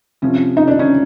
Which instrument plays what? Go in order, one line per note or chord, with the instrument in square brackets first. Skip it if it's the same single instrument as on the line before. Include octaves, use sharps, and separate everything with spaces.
[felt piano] C3 F3 C#4
D#4
D4
C#4